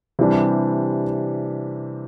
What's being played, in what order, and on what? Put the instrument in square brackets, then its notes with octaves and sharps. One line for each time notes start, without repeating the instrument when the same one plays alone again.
[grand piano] C3 E3 G3 D4